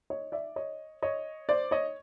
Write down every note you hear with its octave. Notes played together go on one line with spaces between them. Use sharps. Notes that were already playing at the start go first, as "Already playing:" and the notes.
C#5 D#5
D5 E5
C#5 D#5
C#5 D#5
C5 D5
C#5 D#5